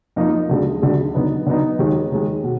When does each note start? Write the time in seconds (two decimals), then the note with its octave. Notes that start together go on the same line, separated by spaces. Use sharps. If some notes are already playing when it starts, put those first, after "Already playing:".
0.16 F2 F3 A#3 D#4
0.49 D2 D3 G#3
0.82 D2 D3 G#3
1.14 D3 F#3 B3 D#4
1.46 D3 F#3 B3 D#4
1.79 D#2 D#3 G#3
2.12 D#2 D#3 G#3
2.44 B2